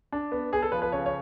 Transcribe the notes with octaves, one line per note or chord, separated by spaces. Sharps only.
D4
B3
B3 G#4
A4
F3 B4
B4
C#3 C#5
C#5